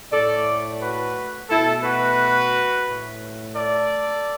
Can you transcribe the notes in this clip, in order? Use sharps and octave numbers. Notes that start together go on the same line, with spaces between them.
A2 A3 A4 D5
F#4 B4
B2 A3 E4 A4
F#4 B4
A2 A3
A4 D5